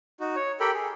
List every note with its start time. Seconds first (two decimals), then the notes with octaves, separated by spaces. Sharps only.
0.20 D#4 F#4
0.36 C#5
0.60 G4 A4 A#4 G5 B5
0.73 G#4